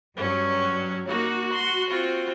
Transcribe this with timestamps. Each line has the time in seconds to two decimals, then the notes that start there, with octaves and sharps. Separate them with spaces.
0.17 G2 F#3 C#4
1.08 A#3 D#4 F#4
1.52 C6
1.89 C4 F4